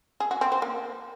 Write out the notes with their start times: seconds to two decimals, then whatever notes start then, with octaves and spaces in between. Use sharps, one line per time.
0.20 G#4
0.31 F#4
0.41 C4
0.52 C5
0.62 A#3